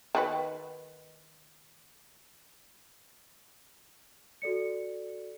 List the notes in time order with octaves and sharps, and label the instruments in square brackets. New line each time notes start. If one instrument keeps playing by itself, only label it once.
[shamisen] D#3 F#4 B4
[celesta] F#4 A4 D5 C#7